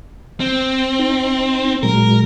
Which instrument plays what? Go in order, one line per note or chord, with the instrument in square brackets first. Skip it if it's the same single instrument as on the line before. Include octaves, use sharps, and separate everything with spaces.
[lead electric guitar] C4
[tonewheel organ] D#4
[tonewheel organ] A#2 F#3 G#3 [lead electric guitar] A#4